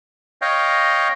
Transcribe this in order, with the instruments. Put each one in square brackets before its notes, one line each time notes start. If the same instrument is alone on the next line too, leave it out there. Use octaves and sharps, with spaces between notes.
[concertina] C#5 D#5 F5 G5